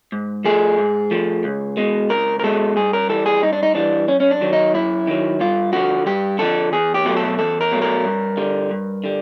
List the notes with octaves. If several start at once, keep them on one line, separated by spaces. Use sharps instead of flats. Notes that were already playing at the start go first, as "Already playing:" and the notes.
G#2
F3 A3 G#4
G#2
F3 A3
C#2
B2 G#3
C#2 A#4
A#4
B2 G#3 A4
G2 G#4
A#4
E3 G3 A4
G#4
G2 D#4
D4
D#4
E3 G3 D4
F#2 C#4
C#4
D4
D#3 F#3
D#4
F#2 E4
D#3 F#3
G2 F4
D3 F3 F#4
G2 G4
D3 F3 A4
E2 G#4
G4
B2 F#3 A3
A4
E2 A4
A#4
B2 F#3 A3
A#4
G2
D3 G3
G2
D3 G3